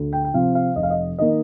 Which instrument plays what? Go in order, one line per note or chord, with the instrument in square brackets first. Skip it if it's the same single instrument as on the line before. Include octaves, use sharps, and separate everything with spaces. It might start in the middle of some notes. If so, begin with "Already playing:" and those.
Already playing: [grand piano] D2
G5
G5
C3 F3 C4 F5
F5
F1 D#5
F5
D#5
D#3 A#3 D#5